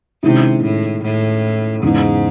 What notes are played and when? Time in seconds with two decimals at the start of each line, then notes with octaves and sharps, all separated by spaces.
0.23 C3 D#3 G#3 C#4 E4
0.64 A2
1.03 A2
1.83 E2 G#2 C#3 G#3 D#4